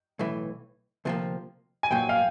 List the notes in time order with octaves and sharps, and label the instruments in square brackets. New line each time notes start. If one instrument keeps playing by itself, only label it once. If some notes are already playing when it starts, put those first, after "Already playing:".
[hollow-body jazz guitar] B1 A2 E3
D2 C3 F3 A#3
[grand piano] G#5
[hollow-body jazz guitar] B1 A#2 F#3 [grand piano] G5
[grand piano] F5